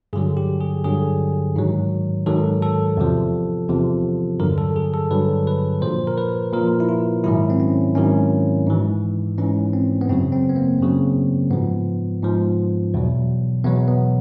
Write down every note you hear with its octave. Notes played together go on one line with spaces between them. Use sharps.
G2 D3 F#3 G#4
G4
G#4
G2 D3 F#3 G#4
G#2 D#3 F#3
G#2 D#3 F#3 A4
A4
E2 C3 F3
E2 C3 F3
G2 D3 F#3 A#4
A4
G#4
A4
G2 D3 F#3 B4
B4
A#2 F3 C5
A#4
B4
A#2 F3 A#4
E4
F4
G#2 D#3 F#3 E4
C4
C#4
G#2 D#3 F#3 C#4
G#2 E3
G#2 E3 C#4
C4
B3
F#2 C#3 F#3 C4
C4
B3
A#3
F#2 C#3 F#3
G#2 F3 B3
G#2 F3
E2 B2 F#3
E2 B2 F#3 B3
B3